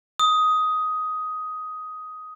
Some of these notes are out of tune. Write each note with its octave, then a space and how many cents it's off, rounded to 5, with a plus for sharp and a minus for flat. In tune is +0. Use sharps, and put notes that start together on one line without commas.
D#6 +10